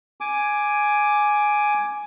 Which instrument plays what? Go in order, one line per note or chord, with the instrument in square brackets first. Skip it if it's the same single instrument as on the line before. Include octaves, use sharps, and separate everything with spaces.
[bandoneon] G#5 D6